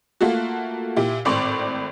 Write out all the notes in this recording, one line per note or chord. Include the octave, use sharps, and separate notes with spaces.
A3 A#3 F4 F#4
A#2 E4 G4
G#1 A2 C4 D5 C6 C#6